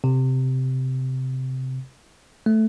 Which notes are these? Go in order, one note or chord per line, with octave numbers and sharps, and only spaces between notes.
C3
A3